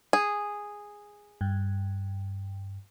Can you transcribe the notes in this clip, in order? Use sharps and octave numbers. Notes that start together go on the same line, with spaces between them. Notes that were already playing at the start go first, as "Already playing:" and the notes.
G#4
G2